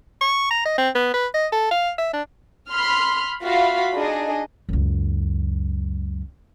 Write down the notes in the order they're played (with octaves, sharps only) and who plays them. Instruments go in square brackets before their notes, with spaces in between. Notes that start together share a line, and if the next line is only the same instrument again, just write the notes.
[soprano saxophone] C#6
A#5
D#5
C4
B3
B4
D#5
A4
F5
E5
D4
[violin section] B5 C6 F6
F4 F#4 E5 F5 B5
D4 D#4 G#4 D#5
[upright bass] C#2 F#2